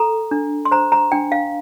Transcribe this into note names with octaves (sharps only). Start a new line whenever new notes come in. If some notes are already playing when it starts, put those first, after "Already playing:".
Already playing: A4 A#5
D4
C6
C5 A#5
A#5
D4 G5
F5